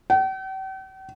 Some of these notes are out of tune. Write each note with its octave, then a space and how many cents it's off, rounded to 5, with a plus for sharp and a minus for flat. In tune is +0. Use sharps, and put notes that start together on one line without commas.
G5 -45